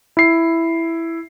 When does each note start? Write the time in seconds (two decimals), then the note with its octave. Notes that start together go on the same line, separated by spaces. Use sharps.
0.17 E4 C7